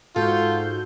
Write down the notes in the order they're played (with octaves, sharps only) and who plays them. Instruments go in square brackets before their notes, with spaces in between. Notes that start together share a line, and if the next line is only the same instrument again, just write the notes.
[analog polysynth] G#2 F#4 G6 [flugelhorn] F4 [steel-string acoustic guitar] A4